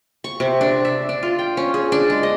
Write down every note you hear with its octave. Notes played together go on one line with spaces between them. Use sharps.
C#6
C3
D4
E5
D4
F4
G5
C#4
G#4
D4
G#3
D#5